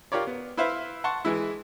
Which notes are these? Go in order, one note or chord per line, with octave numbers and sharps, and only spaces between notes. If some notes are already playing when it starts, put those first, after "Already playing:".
F4 G4 A#4 C#5 D5
B3
E4 B4 C5 E5 F5
F#5 A5 C6 C#6
E3 G#3 E4